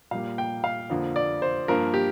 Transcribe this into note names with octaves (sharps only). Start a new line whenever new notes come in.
A#2 G3 A#3 F5
G5
F5
F2 D3 F3 A#3
D5
C5
G2 F3 A#3 A#4
G4